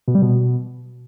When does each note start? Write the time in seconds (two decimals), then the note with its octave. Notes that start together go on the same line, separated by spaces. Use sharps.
0.08 B2
0.15 G3
0.22 B2